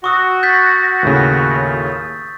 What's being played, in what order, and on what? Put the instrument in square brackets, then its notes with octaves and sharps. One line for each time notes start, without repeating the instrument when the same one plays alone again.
[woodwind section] F#4 [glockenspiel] C#6 D#6 E6
[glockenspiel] G6 A6 B6
[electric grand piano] D#2 A2 C#3